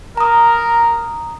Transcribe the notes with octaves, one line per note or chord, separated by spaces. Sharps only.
A#4 A#5 D#6